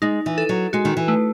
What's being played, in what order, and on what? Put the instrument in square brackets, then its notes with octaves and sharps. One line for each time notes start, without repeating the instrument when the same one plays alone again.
[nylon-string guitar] G#3 [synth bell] D#4
[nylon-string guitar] E3
[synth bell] A4
[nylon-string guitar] F#3
[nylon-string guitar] G#3 [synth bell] F#4
[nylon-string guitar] D#3
E3
[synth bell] A3